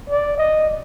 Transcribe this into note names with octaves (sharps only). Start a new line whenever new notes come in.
D5
D#5